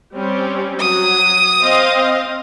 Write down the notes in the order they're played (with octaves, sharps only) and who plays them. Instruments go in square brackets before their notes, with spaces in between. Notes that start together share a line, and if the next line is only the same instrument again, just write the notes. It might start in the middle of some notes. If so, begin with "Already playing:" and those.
[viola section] G3 C4 C#4
[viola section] F#3 [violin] D#6
[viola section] C4 D#5 F5